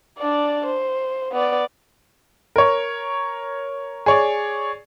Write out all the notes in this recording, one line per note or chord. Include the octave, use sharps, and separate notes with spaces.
D4 D5
C5
B3 D5
A#4 C#5
G#4 C#5 D5